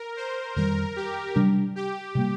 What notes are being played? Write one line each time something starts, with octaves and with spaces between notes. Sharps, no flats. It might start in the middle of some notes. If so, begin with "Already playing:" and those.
Already playing: A#4
C5
F2 D#3 G3 A#4
G4
C3 G3 D4
G4
C3 G3 A#3